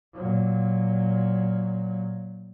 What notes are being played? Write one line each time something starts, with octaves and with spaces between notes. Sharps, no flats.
A#2 F#3